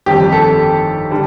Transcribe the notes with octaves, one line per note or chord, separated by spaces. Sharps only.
G1 F2 D#3 G3 G4
A4
D3 G3